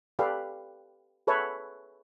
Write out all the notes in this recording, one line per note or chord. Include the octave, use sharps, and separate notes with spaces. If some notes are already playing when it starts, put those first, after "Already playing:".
G4 A4 B4 D5 F5
G#4 A4 B4 C#5 E5 A5